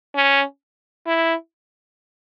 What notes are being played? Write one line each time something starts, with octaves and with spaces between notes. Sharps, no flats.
C#4
E4